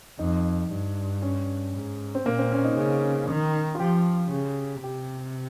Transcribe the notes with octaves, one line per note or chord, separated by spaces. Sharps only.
F2 D#4
G2
C#4
G#2
C4
A#2 A#3
C4
C#4
D#4
C#3
D#3
F4
F3 G4
C#3
C3 G4